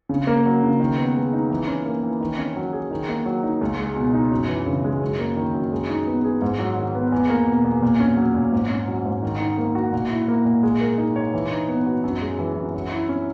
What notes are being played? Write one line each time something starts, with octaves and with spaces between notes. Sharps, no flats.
C#3
A#3
F#3
C#3
D#3
B3
G#3
D#4
E3
C#4
A#3
E3
D#3
C#4
F#3
G#4
D#3
A#3
F#3
D#4
C#2
G#3
B2
D#4
F#2
E3
C#3
G#3
F#2
A#3
D#3
F#2
G#3
D#4
B3
G#4
G#2
F#3
D#3
B3
E2
A#3
B2
E2
A#2
C#4
F#3
A#2
G#2
C#4
F#3
G#2
D#3
D#4
A#3
F#4
A#2
E4
A#3
A#2
G#3
A#4
D#4
C#5
E3
D#4
B3
F#4
F#2
G#3
E3
F#2
F#3
E4
C#4